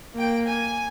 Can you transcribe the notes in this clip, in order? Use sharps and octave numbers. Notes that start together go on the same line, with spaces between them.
A#3 G5
G#5